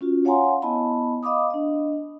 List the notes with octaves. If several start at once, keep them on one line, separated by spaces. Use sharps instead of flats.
C#4 F4 F#4
C#5 F5 F#5 G#5 A#5 C6
B3 E4 D#5 A5 B5
D#5 F5 B5 D6 D#6
D4 D#5